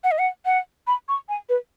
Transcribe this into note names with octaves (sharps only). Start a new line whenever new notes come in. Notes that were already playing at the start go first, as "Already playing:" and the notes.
F#5
D#5
F#5
F#5
B5
C#6
G#5
B4